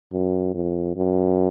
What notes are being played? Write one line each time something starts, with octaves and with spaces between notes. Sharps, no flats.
F#2
F2
F#2